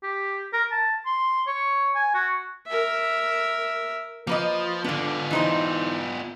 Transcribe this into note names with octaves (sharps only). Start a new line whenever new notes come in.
G4
A#4
A5
C6
C#5
G#5
F#4
A#4 E5
F3 A#3 B4 D#5
D3 B3 D4 F4
E3 D#4 C5